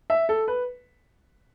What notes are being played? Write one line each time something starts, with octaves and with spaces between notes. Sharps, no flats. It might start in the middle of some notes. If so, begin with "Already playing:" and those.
E5
A4
B4